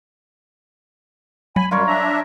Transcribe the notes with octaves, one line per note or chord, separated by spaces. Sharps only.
F#3 G#5 B5
F#2 G3 F4 A#4 C#5
D4 E5 A#5